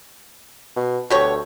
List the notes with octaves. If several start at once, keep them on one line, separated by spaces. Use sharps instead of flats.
B2
D2 B2 G4 C#5